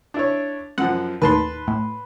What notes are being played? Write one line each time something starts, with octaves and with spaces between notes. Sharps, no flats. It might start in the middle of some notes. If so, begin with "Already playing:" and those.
D4 E4 C#5
F#2 F3 F#5
D#2 A2 D#3 B4 A5 C6
A2